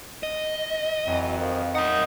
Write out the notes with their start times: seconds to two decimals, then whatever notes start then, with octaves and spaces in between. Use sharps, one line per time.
0.23 D#5
1.05 F2 E3 F#3
1.37 D#3 F3
1.75 D#4 A#4 D#5 F#5